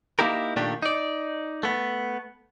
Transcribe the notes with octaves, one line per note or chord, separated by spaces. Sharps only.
A#3 D#4 E4 G4 A#4
A#2 D#3 A3 D4 G4
D#4 D5
A3 B3